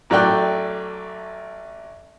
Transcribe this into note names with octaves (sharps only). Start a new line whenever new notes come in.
A1 F#3 A3 D5 G5 F#6